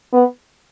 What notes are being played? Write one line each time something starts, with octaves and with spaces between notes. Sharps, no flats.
B3